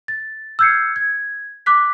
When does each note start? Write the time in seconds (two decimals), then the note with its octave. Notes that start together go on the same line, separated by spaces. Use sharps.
0.08 A6
0.59 E6 F6 G6 G#6 C7 C#7
0.96 G#6
1.66 D6 F#6 B6